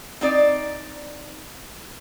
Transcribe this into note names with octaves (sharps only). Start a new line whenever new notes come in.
C4 D#4 D5